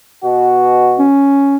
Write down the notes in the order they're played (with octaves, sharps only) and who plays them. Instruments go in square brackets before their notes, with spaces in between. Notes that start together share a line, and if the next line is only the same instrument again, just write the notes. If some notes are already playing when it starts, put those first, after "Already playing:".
[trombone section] B2 F#4
[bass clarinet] C#4